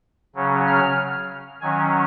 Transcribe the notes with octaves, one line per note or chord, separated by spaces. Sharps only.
C#3 F#3 C#4
F6
D#3 F#3 C#4 G#5